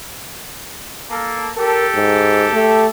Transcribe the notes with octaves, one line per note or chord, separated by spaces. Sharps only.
A#3 A4
G4 A4 A#4
G#2
A3